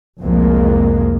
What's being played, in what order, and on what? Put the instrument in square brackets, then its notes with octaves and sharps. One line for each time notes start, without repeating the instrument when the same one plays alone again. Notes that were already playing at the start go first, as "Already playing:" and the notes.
[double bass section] F1 C2 F2 G#3 A#3